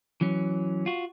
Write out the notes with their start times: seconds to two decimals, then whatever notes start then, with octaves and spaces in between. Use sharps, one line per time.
0.21 E3 F#3 C#4
0.86 F4 F#4